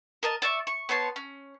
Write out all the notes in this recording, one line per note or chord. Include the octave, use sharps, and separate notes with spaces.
A#4 D#5 A5
D5 E5 C#6
C#6
B3 C#5 A5 C6
C#4